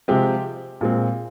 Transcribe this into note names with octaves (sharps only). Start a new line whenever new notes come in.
C3 F3 G#3 C4 G4
A#2 G#3 C4